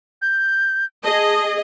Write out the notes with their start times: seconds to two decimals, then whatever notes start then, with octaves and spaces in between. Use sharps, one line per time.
0.22 G6
1.04 G#4 D#5 A5